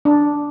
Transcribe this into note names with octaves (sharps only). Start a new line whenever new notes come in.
D4